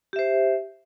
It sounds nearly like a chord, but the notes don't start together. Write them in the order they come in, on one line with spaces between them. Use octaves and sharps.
G4 E5 C5